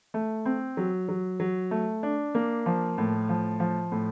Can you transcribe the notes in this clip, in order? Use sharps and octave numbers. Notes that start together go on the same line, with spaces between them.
A3
C4
F#3
F#3
F#3
A3
D4
A#3
F3
A2
F3
F3
A2